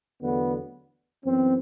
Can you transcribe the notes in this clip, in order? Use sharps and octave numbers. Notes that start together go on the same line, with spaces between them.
E2 D3 F#3 A3 B3
F#2 E3 B3 C4